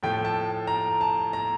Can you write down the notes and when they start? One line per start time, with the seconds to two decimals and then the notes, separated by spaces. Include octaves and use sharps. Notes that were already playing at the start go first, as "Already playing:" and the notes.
0.03 A2 F3 A3 G5
0.25 A5
0.67 A#5
1.01 A5
1.33 A#5